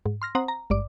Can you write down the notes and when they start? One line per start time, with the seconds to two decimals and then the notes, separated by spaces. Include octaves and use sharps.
0.06 G#2
0.22 C6 F6 A#6
0.35 C4 C5 F#5 A#5 D#6
0.48 A#5
0.70 G#1 G2 D5 D6